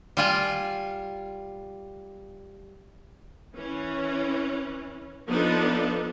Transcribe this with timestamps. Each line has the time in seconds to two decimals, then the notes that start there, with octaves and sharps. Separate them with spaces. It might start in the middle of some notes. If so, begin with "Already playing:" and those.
0.17 G3 F4 G#5
3.55 E3 C#4
5.28 F3 B3 D4 D#4 A4 B4